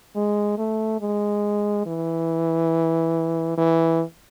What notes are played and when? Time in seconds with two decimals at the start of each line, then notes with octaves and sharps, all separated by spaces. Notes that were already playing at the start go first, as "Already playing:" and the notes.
0.16 G#3
0.58 A3
1.00 G#3
1.86 E3
3.57 E3